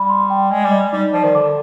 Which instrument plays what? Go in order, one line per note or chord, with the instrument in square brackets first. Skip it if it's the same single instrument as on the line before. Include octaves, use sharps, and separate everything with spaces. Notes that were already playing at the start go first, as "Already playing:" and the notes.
Already playing: [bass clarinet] G3 [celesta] B5
[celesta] C6
G5
[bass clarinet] G#3 [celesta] G#5
[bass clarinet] G3
[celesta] D#5
[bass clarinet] G3 [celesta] D#4
[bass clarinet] F3 [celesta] D5
[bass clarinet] D#3
[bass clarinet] D3 [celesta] D6